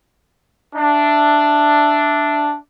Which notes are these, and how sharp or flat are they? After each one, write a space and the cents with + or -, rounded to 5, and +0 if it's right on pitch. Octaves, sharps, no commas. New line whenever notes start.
D4 +0 E5 +0